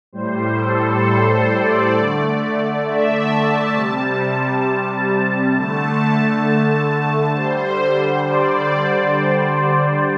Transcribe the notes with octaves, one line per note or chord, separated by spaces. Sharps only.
A2 G3 C5
A4
C5
D5
D3 A3
E5
A5
C3 G3
D3 A3 A5
D3 G3 C5
D5